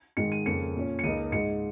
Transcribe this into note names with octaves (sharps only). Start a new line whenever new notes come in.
G#2 D#3 G#3 D#4 C#7
D#7
F2 C#3 A#3 C#7
A#2 F3 C#4
C#7
C#2 C#3 A#3 D#4 D#7
G#2 G#3 D#4 C#7